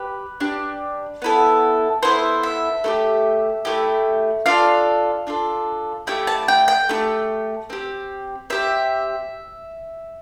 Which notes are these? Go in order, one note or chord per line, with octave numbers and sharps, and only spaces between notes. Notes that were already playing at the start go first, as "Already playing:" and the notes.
Already playing: G4 B4
D4 G4
B3 E4 A4
B3 E4 A4 C5
E5
A3 E4 G4
A3 E4 G4
D4 F4 A4 F5
D4 F4 A4
A3 E4 G4 G5
A5
G5
G5
A3 E4 G4
C4 G4
C4 G4 E5